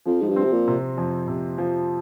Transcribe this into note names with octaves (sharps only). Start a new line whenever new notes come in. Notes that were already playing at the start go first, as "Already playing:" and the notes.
F2 F3
G#2
G2
C4
C3
A#2
C3
F2
C3
F3